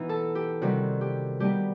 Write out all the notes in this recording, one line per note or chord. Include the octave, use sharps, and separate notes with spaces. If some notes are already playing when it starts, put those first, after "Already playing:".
Already playing: B2 E3 B3 D#4
A4
G4
C3 D#3 G3 F#4
G4
B2 G3 B3 D#4 G4